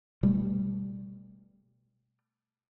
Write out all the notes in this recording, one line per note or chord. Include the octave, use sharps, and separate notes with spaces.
B2 G3 A3